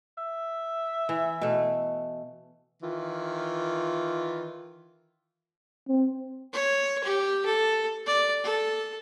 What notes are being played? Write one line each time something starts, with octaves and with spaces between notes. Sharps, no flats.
E5
E3
B2 A3
D#3 E3 F4
C4
C#5
G4
A4
D5
A4